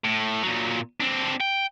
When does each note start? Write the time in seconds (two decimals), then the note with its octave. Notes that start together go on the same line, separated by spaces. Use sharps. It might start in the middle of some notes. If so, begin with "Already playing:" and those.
0.04 A2
0.43 A#2 F#3
1.00 C4 D4
1.40 G5